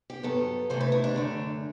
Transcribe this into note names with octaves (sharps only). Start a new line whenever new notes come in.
G4
G2 F#3 B3 A4
C3 E3 A3 C5
B4
E4
D4
F#2 D3 A3